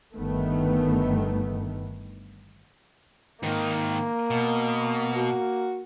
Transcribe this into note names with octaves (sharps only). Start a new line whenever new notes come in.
G1 D#3 A3 B3
G#2 D#3 A#3
B2
F#4